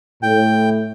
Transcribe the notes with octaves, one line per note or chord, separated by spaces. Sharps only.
A2 G5